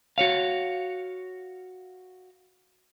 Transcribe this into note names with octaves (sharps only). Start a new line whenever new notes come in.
F#4 C#5 F5